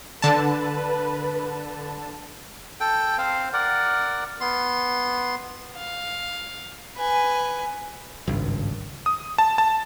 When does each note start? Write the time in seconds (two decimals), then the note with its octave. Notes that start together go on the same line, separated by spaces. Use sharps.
0.22 D3 B4 A5
2.80 A4 G5
3.18 C4 C5 F5
3.53 A#4 D5 F#5
4.40 B3 C6
5.77 F5
6.97 B4 G#5
8.27 G#1 C#2 G2
9.06 D#6
9.38 A5
9.58 A5